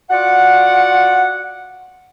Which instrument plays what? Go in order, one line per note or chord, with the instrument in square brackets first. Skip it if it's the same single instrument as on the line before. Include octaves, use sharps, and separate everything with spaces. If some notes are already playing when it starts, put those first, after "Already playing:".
[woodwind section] F4 F#4 D5 F#5